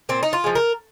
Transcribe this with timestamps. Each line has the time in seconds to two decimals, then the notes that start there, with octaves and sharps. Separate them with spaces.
0.09 A#2 C4
0.23 D#4
0.33 F4
0.44 F3 G#3
0.55 A#4